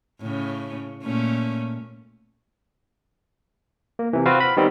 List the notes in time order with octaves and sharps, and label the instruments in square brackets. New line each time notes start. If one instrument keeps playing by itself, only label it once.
[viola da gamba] A2 C#3
A#2 A3 C#4
[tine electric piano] A#3
C3 E3
C4 F4 F#4 B4 F5
B5
D#3 G3 B3 C4